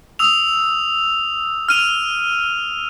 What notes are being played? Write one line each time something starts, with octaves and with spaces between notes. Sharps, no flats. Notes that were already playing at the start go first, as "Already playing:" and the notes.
D#6 E6 F7
F6 D#7 F7